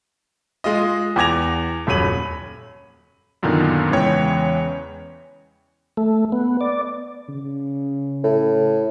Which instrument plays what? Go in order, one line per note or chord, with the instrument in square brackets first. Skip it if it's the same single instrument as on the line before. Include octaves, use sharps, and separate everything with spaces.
[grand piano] G#3 F4 D#5
E2 G#5 D6 G#6 A#6 F7
D#1 F#2 C#5 B5 D#7 F#7
[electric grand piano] F#2 A#2 D3 D#3 B3 D#4
E2 C#3 E3 G#3 C#5 G5
[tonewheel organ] A3
B3
D5
[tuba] C#3
[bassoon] A2